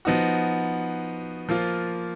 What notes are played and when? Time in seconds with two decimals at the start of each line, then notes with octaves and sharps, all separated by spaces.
0.05 F3 B3 D#4 F#4
1.49 F3 A#3 F4